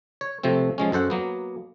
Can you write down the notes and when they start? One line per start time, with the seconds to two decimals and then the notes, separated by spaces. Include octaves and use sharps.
0.21 C#5
0.43 C3 F3 A3 C4
0.78 F3 G#3 C#4
0.92 F#2 A4 C5 F#5
1.10 F#3 A#3 B3